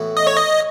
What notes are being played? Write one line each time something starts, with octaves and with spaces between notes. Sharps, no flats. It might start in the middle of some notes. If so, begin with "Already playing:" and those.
Already playing: A2 E3 B3 F#4
D#5
C#5
D#5